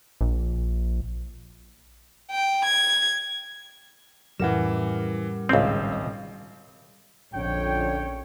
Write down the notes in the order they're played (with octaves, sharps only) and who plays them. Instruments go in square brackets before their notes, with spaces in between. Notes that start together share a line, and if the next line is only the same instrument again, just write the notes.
[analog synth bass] A#1
[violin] G5
G#6
[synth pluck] F2 A2 C#4 [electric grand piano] E3 E7 [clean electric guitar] G3 A#4 F#5
[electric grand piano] G#1 [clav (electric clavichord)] C#2 C4 [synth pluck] A2 C#4 E6
[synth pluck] D#5
[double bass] A#1 [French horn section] F2 D3 [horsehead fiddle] C#4 C#5 [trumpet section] G5